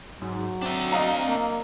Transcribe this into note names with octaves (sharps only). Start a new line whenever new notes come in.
G#2 F#3
C4 D4 E5
D#5 F5 A#5
A#3